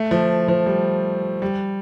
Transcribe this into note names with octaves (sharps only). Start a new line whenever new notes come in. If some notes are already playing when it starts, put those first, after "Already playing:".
Already playing: A3
F3
F3
G3
G3